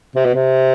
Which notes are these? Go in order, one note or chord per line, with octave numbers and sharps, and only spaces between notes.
C3
B2
C3